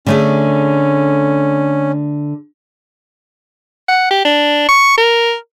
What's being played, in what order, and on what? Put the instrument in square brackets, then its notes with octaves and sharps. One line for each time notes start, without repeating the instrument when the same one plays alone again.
[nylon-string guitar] D3 A3 G#4 [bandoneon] C#4
[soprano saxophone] F#5
G4
D4
C#6
A#4